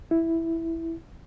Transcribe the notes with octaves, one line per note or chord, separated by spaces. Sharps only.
E4